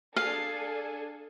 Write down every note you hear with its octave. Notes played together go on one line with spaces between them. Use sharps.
D4 G#4 A4 F5